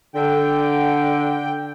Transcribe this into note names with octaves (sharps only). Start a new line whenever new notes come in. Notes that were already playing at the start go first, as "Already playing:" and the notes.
D3 G5